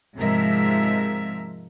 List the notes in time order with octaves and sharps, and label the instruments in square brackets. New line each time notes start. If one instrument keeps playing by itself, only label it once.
[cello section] G#2 C3 F3 G#3 A#4 E5